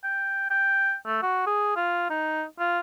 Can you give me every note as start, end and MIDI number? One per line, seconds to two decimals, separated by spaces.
0.04 0.48 79
0.50 0.95 79
1.06 1.22 57
1.23 1.42 66
1.47 1.76 68
1.76 2.08 65
2.10 2.45 63
2.59 2.80 65